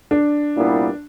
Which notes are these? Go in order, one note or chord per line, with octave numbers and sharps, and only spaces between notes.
D4
C2 A#2 G3 B3 E4